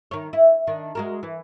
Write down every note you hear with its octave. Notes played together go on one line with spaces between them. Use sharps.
D#3 C#5
E4
D#3 D4
G#3 F#4 A#4
E3